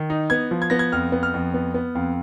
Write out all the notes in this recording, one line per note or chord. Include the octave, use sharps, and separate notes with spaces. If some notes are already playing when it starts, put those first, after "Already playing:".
Already playing: D#3
D#4
B3 G#6
F3
G#6
B3 A#6
G#6
F2 F6
B3
F6
F2
B3
B3
F2